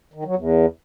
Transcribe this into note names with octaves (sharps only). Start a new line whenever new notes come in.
D#3
F#3
E2